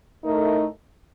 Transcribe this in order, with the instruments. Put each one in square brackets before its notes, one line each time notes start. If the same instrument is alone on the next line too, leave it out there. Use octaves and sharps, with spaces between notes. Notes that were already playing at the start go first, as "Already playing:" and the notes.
[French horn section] A2 A3 D#4 A#4